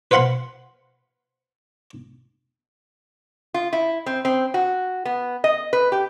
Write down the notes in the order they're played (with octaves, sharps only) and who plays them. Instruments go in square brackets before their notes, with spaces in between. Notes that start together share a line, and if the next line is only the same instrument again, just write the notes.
[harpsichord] B4 C5 F5 F#5 B5 C6
[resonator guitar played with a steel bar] F4
E4
C4
C4
F#4
B3
D#5
B4
G4